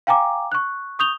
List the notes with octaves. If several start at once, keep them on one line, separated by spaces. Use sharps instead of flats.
F5 G5 G#5 A#5 D6
C#6 F#6
C#6 D#6 G6 F7 G7